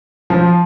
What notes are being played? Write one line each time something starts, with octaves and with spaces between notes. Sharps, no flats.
F3